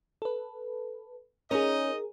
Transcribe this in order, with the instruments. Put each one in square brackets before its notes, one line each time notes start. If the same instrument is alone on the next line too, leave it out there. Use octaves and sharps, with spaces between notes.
[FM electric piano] A4 B4
[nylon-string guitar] C#4 [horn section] D#4 D#5 [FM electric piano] G#4 A#4